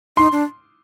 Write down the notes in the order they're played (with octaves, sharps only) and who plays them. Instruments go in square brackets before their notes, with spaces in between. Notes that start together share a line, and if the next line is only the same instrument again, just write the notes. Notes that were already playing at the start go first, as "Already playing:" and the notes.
[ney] D#4 [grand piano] C6
[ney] D4